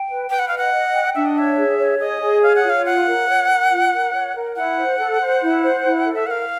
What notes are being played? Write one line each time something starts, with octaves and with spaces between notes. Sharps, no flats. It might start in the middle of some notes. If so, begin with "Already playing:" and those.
Already playing: G5
B4
B4 G5
F#5
D#5 F5
F#5
D#5
G5
D4 E5
D#5
C#5 E5
G#4
C#5
G#4 D#5
G#4
C#5 F5
F#5
F4
F5
F5 F#5
A#4
C#5
A#4
F4
A#4
C#5
A#4
E4 F#5
C5
A4
C5
E4
C5
E4
A4
E5
A#4 F5 F#5